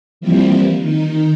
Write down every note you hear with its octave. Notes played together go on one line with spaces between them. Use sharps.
E3 F3 G3 A#3 C4 E4
D#3 D#4